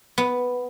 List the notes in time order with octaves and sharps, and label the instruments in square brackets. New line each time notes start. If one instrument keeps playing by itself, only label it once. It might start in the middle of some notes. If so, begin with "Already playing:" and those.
[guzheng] B3